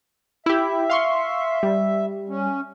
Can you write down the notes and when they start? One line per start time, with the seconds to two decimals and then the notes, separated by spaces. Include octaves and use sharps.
0.46 E4 G4 E5
0.90 F5 C6 C#6
1.63 G3
2.29 C#4